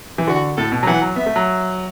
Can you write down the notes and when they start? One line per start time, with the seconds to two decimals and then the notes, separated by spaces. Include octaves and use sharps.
0.18 E3
0.27 D3 F#4
0.57 A2 A4
0.72 B2
0.83 F#3
0.87 E3 F#5
1.02 F#3
1.16 B3 E5
1.26 A3
1.36 F#3